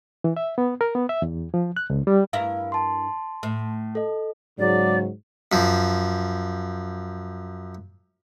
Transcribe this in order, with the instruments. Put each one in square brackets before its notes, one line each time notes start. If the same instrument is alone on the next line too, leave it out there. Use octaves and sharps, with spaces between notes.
[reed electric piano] E3
E5
B3
A#4
B3
E5
E2
F3
F#6
C#2
G3
[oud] G2 E4 A#4 [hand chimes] F5
[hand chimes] A5 C6
[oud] A2
[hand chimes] A4 D#5
[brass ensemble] G#2 C#3 F#3 [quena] D5
[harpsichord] F#2 F3